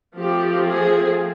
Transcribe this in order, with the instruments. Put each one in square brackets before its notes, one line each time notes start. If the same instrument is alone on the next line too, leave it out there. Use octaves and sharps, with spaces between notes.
[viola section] F3 A3 C4 G4
G#4